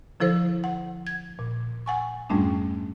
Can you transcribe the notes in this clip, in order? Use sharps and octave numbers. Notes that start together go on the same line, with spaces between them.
D3 F3 E4 A4 C5
F#5
G#6
A#2
F#5 G#5 C#6
F2 G#2 G3 A3 C#4 D4